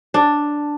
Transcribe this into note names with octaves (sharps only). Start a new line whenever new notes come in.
D4